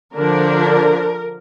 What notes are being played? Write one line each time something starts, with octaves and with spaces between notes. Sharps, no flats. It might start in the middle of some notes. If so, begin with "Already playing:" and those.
D3 F3 D4 A#4